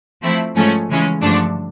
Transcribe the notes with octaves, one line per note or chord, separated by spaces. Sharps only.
F3 A3 C4 E4
G#2 F3 A3 C#4
C#3 E3 G#3 C#4
G2 D3 F3 A3 D4